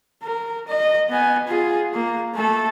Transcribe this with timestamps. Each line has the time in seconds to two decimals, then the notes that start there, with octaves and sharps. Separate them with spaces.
0.23 A#4
0.68 D#5
1.10 B3 G#5
1.48 F4 G#4
1.94 A#3
2.35 A3 A4